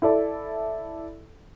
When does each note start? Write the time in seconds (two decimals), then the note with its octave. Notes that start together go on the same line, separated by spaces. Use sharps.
0.02 E4 A4 D5